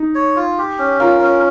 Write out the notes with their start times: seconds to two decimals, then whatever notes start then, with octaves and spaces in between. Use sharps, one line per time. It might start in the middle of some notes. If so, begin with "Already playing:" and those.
Already playing: D#4
0.15 C#5
0.36 F4
0.58 G4
0.79 C#4
1.00 F4 A#4
1.21 C#4